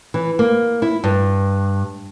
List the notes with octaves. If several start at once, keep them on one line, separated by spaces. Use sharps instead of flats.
E3
A#3
E4
G2